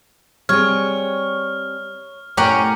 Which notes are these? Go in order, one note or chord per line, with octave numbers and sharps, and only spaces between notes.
G3 C4 G#4 C#5 F6
A2 C#4 G4 A#4 F#5 G5